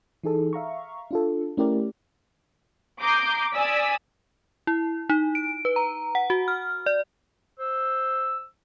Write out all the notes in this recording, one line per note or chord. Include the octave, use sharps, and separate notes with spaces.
E3 D#4 G#4 A4
E5 F5 A#5 C#6
D4 F4 A4
A3 C#4 E4 G4 A#4 D5
A#5 D6 D#6 G6 C7
D5 G#5 D#6 E6 B6
E4
D#4
D7
B4
A#5
F#5
F#4
F6
D5
C5 E6